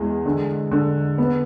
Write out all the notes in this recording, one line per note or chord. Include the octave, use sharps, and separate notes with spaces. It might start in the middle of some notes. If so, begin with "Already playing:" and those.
Already playing: E2 G#3
D3
D3
B3